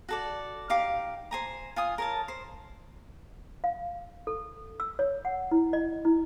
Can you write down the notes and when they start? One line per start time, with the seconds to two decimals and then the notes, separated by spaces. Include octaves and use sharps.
0.09 F#4 A4 D5
0.69 D#4 G4 F5 D6
1.31 C5 G#5 A#5
1.76 F4 G#5 D#6
1.98 A#4 C#5 A5
2.28 C5
3.64 F5
4.27 A4
4.80 E6
4.99 C#5
5.25 F#5
5.51 E4
5.73 D#5
6.05 E4